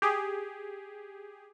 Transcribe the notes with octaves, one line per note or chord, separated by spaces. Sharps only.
G4 G#4